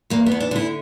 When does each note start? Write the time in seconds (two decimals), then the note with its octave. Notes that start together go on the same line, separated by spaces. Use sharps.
0.10 E2 A#3
0.26 B3
0.31 E2
0.40 D4
0.51 D3 E4